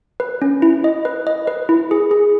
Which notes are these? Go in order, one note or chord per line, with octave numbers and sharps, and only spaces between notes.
B4
C#4
E4
D#5
B4
D#5
B4
E4
G#4
G#4